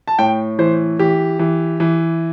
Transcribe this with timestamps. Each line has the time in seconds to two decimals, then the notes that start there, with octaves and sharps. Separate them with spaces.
0.08 A5
0.19 A2 G5
0.59 E3 C5
0.99 E3 G4
1.39 E3
1.80 E3